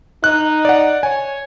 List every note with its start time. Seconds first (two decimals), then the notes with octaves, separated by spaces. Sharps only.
0.24 D#4 F#6
0.65 D5 F#5
1.03 C#5 G#5